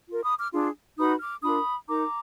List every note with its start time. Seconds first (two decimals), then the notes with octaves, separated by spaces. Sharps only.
0.09 F4 A#4
0.23 B5 D#6
0.38 D6 F6
0.52 D4 F4 G#4
0.97 D#4 F#4 B4 B5 D#6
1.20 D6 F6
1.42 D4 F4 A#4 B5 D#6
1.87 D#4 A#4 A#5 D6